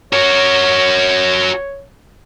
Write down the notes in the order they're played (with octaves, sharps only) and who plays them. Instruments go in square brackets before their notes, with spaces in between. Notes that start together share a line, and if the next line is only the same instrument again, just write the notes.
[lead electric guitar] F#4 A#4 [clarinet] C#5